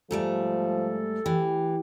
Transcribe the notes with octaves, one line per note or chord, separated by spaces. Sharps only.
G#2 F3 G3 A3 A4
E3 G4